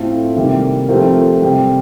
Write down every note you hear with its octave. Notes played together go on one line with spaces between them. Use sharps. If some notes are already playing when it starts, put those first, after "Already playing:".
Already playing: A2 A3 C4 F4 A4
C3 D#3 G3 A#3
F3 A3 C4 G4 A#4
C3 G3 C4 G4